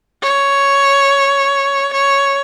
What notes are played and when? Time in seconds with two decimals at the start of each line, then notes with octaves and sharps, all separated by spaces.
0.22 C#5
1.93 C#5